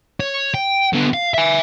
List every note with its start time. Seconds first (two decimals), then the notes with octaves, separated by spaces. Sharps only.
0.20 C#5
0.54 G5
0.93 D3 B3
1.13 F5
1.34 E5 G#5